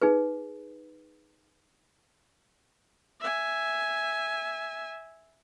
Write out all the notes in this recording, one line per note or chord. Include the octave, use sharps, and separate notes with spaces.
D#4 G#4 B4
E5 G#5